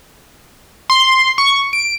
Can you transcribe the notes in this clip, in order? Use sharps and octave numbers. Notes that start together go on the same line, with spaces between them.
C6
C#6
D7